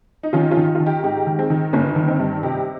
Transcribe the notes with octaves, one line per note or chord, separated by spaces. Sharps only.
D#4
D#3 C#4 F4
C#4 F4
D#3
F4
D#3
D#4 G4
G#2 D#4 G4
D#3
G#3 C4
D#3
G1 A#3 C#4
D#3
C4 D#4
G2
C3 D#4 G4